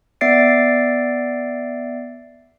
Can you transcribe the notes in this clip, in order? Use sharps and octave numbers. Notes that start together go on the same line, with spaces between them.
B3 D5 E5 A6 C7 D7